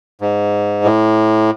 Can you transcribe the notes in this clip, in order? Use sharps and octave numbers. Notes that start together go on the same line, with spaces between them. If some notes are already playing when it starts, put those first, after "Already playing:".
G#2
A2